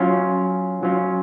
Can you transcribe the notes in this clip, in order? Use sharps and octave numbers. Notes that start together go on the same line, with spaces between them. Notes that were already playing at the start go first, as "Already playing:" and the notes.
Already playing: F#3 C#4 F4
F#3 C#4 F4